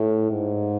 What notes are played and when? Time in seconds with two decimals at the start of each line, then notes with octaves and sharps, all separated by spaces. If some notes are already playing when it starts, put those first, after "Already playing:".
Already playing: A2
0.31 G#2